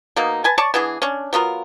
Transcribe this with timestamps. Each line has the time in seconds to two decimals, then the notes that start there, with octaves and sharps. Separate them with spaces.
0.16 B2 A#3 D#4
0.44 B4 G#5 A5
0.58 C#5 D5 A5 C#6
0.74 E3 B3 D4 G#4
1.02 C#4 D4
1.33 F#3 B3 F4 A#4